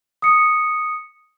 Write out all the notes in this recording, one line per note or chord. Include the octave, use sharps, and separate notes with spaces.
D#6 C#7